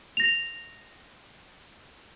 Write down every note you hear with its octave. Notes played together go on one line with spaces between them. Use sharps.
A#6 F7